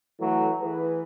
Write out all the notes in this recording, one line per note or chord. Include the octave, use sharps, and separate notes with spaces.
E3 F#3 A3
E3 G#4 B4